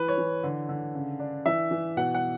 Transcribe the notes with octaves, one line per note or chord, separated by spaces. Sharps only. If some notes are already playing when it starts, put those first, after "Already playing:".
Already playing: E3 B4
C#5
E3
D3
D3
C#3
D4
E3 E5
E3
B2 F#5
F#5